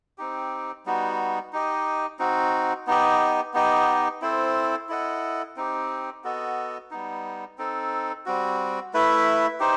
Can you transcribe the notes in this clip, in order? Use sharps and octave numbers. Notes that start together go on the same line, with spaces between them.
C4 D#4 G4
G3 B3 D#4 F#4
D#4 G4 D#5
C4 D#4 F#4
B3 D#4 G4 D#5
B3 D#4 G4 D#5
C4 E4 A4 C5
E4 A4 D#5 F#5
C4 D#4 G4
B3 F#4 A4 D#5
G3 B3 D#4
C4 D#4 A4
G3 C4 F#4
A3 E4 B4 E5
D#4 G4 C5